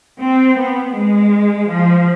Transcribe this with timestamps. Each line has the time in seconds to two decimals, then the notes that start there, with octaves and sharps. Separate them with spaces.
0.20 C4
0.57 B3
0.95 G#3
1.69 F3